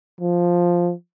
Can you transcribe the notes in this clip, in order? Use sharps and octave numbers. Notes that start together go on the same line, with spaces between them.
F3